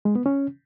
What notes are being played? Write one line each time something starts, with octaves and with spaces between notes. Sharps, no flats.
G#3
B3
C#4